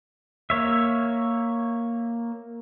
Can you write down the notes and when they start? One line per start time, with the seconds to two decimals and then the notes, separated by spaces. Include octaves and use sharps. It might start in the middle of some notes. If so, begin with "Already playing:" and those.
0.50 A#3 C#5 E5